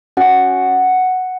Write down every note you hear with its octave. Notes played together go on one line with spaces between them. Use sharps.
C#4 F#4 F#5